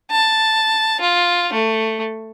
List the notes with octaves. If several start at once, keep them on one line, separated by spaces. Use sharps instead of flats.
A5
F4
A3